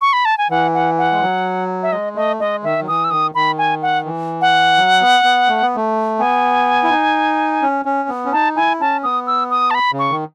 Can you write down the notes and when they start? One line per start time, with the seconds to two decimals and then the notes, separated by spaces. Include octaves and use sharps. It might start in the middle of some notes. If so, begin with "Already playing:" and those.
0.01 C#6
0.13 B5
0.25 A5
0.38 G#5
0.50 E3 F#5
0.74 F#5
0.98 F#5
1.12 G#3
1.21 F#3
1.83 E5
1.92 G#3 D#5
2.15 A3 D#5
2.40 G#3 D#5
2.63 D#3 E5
2.82 F#3
2.87 E3 D#6
3.04 E6
3.10 D#3 D#6
3.35 D#3 B5
3.58 G#5
3.82 F#5
4.05 E3
4.41 F#5
4.77 F#3
5.01 B3
5.24 B3
5.48 A3
5.62 B3
5.76 A3
6.19 B3 G#5
6.84 E4
6.90 D#4
7.62 C#4
7.85 C#4
8.09 B3
8.25 C#4
8.32 D#4 A5
8.56 E4 G#5
8.80 C#4 A5
9.03 B3 D#6
9.27 E6
9.51 D#6
9.70 A5
9.74 B5
9.92 C#3
9.99 C#6
10.11 D#3